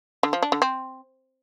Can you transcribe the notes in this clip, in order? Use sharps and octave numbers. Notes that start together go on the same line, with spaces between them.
D3
F3
D4
D3
C4